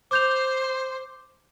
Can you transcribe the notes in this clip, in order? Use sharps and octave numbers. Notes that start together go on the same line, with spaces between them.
C5 D6 G6 F7